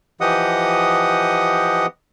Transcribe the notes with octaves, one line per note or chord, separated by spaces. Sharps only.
E3 F3 G4 D#5 F#5 D#6